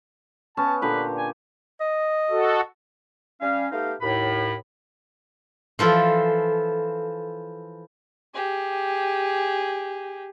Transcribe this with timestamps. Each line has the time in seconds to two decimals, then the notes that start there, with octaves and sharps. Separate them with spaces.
0.57 B3 C#4 A5
0.82 A#2 D3 G4 B4
1.17 G#5
1.80 D#5
2.30 F#4 A4
3.41 G3 C#4 F5
3.72 A3 B3 D#4 G4 F5
4.01 D#2 A2 B5
5.79 E3 F3 F4 A4
8.34 G4 G#4